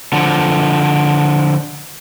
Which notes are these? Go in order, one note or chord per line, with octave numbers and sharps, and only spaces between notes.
D3 F3